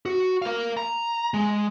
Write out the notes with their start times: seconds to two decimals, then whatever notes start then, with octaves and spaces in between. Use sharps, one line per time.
0.06 F#4
0.42 A#4 F5
0.77 A#5
1.34 G#3